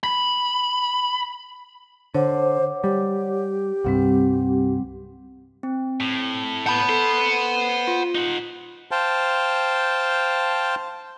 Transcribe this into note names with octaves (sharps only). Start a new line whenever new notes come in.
B5
D3 C5 C#5 F#5 D6
G3 G4
C2 G2 G3 C4 F#5
C4
A2
F#5 A5 B5 G6
A4 C5
F4
D#4 F#5
C5 F5 G5 A5